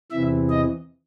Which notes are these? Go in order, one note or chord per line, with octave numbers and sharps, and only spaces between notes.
E2 C3 E3 E5
D#5